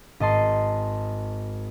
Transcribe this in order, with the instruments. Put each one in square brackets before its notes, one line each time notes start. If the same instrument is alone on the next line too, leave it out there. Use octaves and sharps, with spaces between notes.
[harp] G#1 D#5 A5 C6